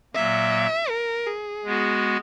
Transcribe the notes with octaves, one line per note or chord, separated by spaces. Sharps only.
A#2 F#3 A#3 E5
A#4
G#4
G#3 B3 F#4